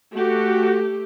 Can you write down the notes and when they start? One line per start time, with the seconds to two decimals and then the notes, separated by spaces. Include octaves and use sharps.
0.13 A3 F#4 G4